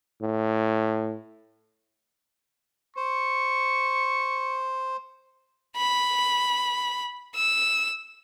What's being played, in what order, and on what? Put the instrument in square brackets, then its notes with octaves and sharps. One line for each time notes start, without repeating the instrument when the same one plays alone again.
[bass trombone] A2
[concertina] C5 [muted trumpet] C#6
[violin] B5
E6